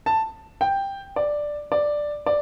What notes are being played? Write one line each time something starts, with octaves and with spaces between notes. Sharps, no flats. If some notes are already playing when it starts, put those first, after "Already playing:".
A5
G5
D5
D5
D5